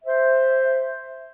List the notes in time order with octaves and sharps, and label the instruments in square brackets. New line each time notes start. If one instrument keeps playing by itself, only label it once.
[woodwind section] C5 E5